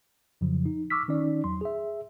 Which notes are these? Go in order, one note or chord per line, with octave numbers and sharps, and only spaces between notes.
F2 C#3 F3 F#3
D#4
C#6 D6 E6 F6 B6
D#3 C#4 D#4 D5
E2 F#3 C6
G#4 E5